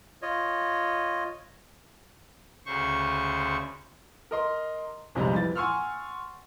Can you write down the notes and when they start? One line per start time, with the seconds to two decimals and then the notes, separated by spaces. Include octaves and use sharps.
0.22 F4 C#5 D#5
2.66 D2 C#3 C5 C#6
4.31 A#4 D#5 C6
5.15 B1 F2 C3 F3 G3 G#3
5.33 F2 E3 A6
5.55 F#5 G#5 C6 C#6 E6 F6